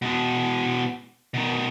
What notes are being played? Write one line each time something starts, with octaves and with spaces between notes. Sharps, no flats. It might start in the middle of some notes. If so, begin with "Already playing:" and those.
B2 G#3
B2 D#3